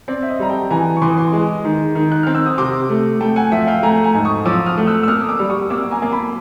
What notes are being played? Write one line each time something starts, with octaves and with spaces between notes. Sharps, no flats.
C4 D5
E5
D#5
G3 A#5
G5 A5
E3 G#5 A#5
C#6
E3 C6 D6
D#6
C6 D6
G#3
D#3
D#3
F#6
C4 F6
E6
D#6
C3 C6 D6
A3
A3 G5 A5
F#5 G#5
F3 E5 F#5
F5 G5
A3 G#5 A#5
G#5 A#5
G#2
C#6 D#6
F3 D6 E6
D#6 F6
A3
E6 F#6
E6
A#3 D#6 F6
D#6
D6 E6
G3
C#6 D#6
A#3 D6 E6
G#5 A#5
A#3
A5 B5